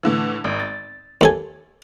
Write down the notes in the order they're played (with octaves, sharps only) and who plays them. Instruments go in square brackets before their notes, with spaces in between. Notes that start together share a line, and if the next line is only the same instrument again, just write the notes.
[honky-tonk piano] A2 D3 E3
G#1
A6
[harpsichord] D#2 A4 G#5